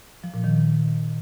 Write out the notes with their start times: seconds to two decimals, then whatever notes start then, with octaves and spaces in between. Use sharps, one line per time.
0.24 F3
0.34 A#2
0.44 D#3